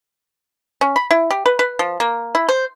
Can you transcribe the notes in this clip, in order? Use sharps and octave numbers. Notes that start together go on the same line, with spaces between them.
C#4
B5
E4
G4
B4
B4
F3
A#3
E4
C5